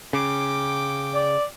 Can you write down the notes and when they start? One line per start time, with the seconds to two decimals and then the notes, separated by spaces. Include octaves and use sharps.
0.13 C#3 G5 D6
1.14 D5